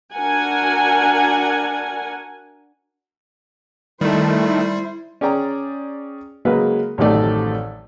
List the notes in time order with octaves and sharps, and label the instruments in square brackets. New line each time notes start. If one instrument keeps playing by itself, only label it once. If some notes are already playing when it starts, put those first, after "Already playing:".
[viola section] D4 F#4 A#4 F#5 G#5
[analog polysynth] D#3 A3 [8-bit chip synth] G3 [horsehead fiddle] E4 C5
[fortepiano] C#4 G#4 D5 G5 A#5
C#3 F#3 G#3 A#3 B4
A1 F#2 C3 D#3 A3 D5